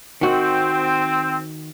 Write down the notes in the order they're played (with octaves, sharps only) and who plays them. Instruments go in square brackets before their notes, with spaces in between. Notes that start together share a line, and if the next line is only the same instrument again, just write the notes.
[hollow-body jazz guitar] D#3 F#4 [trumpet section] C4